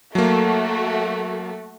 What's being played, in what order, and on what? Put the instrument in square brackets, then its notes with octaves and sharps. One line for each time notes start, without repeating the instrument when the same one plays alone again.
[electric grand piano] F#3 A#3 [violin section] A3 F#4